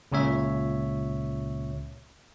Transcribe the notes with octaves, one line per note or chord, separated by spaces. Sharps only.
C#2 A#2 C#3 C#5 E5